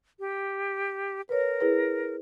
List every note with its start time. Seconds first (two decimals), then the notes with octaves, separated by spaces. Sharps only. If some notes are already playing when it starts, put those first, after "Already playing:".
0.19 G4
1.29 A#4 B4 C#5
1.60 E4 G#4 B4